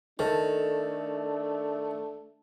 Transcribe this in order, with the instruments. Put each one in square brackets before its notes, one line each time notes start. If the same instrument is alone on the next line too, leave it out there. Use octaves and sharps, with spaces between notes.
[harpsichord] D#3 [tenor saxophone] A3 [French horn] D4 [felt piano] A4